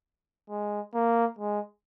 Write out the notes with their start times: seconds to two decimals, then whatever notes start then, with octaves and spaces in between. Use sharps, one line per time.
0.50 G#3
0.94 A#3
1.39 G#3